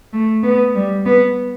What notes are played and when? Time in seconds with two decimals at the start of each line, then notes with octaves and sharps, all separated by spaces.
0.13 A3
0.43 B3
0.75 G3
1.05 B3